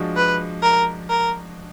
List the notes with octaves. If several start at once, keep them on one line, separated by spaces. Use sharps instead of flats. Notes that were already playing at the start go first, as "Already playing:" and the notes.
Already playing: F3 G#3 D4 F#4
B4
A#4
A#4